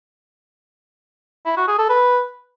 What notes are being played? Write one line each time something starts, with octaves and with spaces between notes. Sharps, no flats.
E4
F#4
G#4
A4
B4